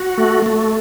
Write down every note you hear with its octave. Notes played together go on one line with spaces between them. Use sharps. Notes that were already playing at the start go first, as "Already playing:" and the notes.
Already playing: F#4
A3
A3